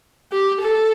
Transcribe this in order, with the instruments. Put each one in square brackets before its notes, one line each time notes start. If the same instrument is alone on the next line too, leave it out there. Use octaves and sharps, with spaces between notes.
[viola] G4
A4